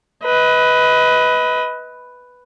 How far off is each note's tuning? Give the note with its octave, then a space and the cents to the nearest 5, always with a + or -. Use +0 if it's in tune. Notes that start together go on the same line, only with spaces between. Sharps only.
B4 +5 D#5 +30